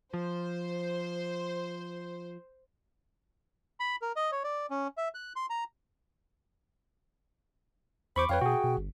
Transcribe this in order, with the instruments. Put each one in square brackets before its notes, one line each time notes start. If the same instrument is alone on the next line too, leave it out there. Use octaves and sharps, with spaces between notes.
[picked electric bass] F3 [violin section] C5
[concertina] B5
A#4
D#5
C#5
D5
C#4
E5
F#6
C6
A#5
[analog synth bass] E2 [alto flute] C5 [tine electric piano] B5 C#6 D6
[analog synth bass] F2 [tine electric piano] B4 C#5 F5 [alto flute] G5
[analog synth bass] B2 [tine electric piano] F#4 G#4
[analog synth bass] B2
G1